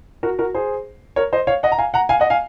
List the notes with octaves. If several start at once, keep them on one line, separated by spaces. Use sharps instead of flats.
F#4 A#4
F#4 A#4
G#4 C5
A#4 C#5
C5 D#5
C#5 F5
D#5 F#5
A#5
F5 G#5
F#5 A#5
F5 G#5
D#5 F#5
F5 G#5